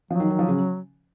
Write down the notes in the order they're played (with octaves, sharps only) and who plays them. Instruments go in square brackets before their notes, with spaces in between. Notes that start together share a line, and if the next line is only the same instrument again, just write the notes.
[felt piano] F3 [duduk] F#3
[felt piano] D#3
D#3
F3
C#3